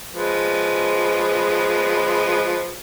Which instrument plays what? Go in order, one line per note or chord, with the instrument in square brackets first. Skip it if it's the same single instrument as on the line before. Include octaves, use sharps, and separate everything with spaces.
[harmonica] F3 G#3 B4